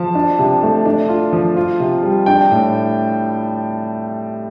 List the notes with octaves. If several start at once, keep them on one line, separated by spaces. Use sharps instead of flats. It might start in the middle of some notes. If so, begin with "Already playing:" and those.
Already playing: F3 A5
D4
C3
A3
D4
F4
F3
F4
C3
G3
D4 G5
A2